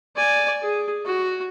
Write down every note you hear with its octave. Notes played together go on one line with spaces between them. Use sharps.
D5 G#5
G#4
F#4